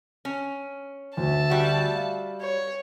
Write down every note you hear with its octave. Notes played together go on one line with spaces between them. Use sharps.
C#4
D2 E5 A5
G3 F#4
F5
C#5